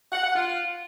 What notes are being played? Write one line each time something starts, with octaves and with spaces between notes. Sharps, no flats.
F#5
F#5
F4